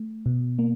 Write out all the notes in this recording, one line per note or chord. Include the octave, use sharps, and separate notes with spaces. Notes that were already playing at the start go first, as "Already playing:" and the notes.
Already playing: A3
B2
A#3